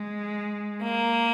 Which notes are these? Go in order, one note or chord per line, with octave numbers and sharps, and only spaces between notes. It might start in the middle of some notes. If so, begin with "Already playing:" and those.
Already playing: G#3
A#3